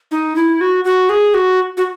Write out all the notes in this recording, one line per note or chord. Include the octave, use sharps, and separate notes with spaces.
D#4
E4
F#4
F#4
G#4
F#4
F#4